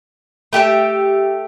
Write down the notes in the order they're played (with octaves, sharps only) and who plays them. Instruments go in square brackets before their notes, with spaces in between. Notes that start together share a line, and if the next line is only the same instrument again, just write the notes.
[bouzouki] A3 G4 G#4 E5